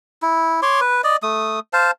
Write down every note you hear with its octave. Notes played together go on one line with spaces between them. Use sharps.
E4
C#5 C6 D6
B4
D5 D#5
A3 D#6
C5 F5 A5